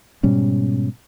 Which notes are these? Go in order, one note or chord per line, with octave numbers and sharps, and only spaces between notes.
G#2 B2 G3 C#4